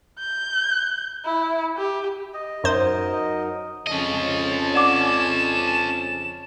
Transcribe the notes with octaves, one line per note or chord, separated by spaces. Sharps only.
G6
E4
G4
D#5
F#2 F#3 D#4 A#4 C5
F2 C#3 C#4 D#5 A5
D5 F#5 D6 E7